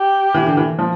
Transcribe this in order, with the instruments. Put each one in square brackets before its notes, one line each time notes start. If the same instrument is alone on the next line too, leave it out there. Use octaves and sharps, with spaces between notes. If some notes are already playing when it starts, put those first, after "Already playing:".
Already playing: [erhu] G4
[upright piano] E3
D3
E3
F3